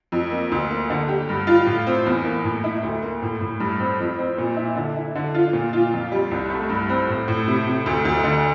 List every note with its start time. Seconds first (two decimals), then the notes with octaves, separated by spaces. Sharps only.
0.12 F2
0.31 A#3
0.52 D2
0.71 A#3
0.90 D3
1.08 G4
1.29 G2
1.47 F4
1.66 A2
1.87 C4
2.06 E2
2.24 A#3
2.44 A2
2.64 E4
2.83 D2
3.02 A#3
3.22 A2
3.41 A2
3.60 G2
3.80 C4
4.00 F2
4.18 C4
4.38 A#2
4.56 E4
4.76 D3
4.96 E4
5.15 D3
5.35 F4
5.53 A#2
5.73 F4
5.93 F2
6.12 G3
6.31 C2
6.50 A3
6.69 G2
6.89 C4
7.09 A2
7.28 A2
7.48 C3
7.67 C3
7.86 D2
8.05 D2
8.24 D3